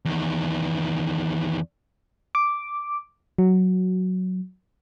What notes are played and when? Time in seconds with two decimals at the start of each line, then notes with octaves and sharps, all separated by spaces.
0.05 E2 D#3
2.35 D6
3.38 F#3